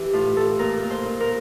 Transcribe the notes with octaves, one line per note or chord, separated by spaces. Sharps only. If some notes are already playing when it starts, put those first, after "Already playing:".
Already playing: E3 G4
A2 F4
A2 A4
A#2 A#4
A#2
C5
A#2
A#4